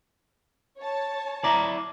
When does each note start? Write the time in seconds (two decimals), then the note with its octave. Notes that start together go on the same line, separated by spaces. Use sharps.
0.78 C#5 A5
1.44 E4 D5 A#5